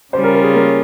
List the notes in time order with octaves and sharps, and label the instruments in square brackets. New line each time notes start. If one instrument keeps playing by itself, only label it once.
[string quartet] C#3 G3 C#4 F4 [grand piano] C5
[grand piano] A#4
A#4
G#4
A#3